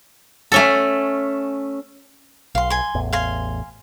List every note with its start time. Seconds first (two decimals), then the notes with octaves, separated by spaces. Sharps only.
0.52 A3 C#4 A4
2.55 B1 F5 C6
2.70 G#5 C6
2.95 A1 E2
3.13 F5 G#5 C6